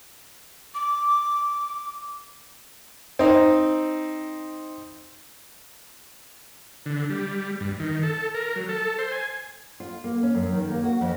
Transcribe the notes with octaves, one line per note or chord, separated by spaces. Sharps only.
D6
C4 D#4
D3
G3
G2
D#3
A4
A#4
F#3
A4
C5
G#5
F4
A#3
C#4
F#2
D#3
A#3
F#4
F2